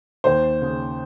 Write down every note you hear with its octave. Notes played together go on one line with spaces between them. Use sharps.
D#2 C5
C#3